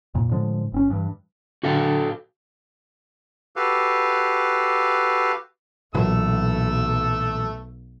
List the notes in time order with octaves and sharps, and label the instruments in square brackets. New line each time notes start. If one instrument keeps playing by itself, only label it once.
[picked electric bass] F2 A#2
A2 D3 F3 G#3
G1 C4 C#4
G2 E3
[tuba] D3 [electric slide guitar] F#4 A4 F5
[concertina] F#4 G4 A4 B4 F5
[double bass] B1 [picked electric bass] A#2 E3 F#3 [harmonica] A3 E6